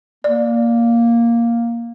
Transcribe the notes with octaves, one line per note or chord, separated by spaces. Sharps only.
A#3 D5